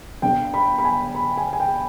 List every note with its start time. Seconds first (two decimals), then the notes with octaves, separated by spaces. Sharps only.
0.22 G1 G2 D3 G5
0.54 B5
0.78 B5
0.84 G#5
1.15 B5
1.37 G#5
1.53 G#5
1.60 G5